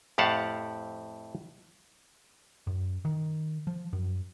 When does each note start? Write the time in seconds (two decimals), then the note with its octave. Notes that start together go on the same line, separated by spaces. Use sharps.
0.18 F2 A2 G4 F5 F#5 A5
2.67 F#2
3.05 D#3
3.67 F3
3.93 F#2